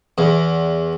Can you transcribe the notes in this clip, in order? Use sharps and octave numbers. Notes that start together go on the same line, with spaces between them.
E2